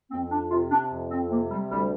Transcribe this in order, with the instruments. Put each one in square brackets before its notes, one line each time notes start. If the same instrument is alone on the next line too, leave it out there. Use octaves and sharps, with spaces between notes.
[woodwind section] F2 C4
D4
C3 F4
D4
F2
C4
C3 A#3
G3
D2 G3